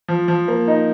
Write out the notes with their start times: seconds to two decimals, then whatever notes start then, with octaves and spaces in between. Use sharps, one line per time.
0.08 F3
0.28 F3
0.48 A#3
0.68 D#4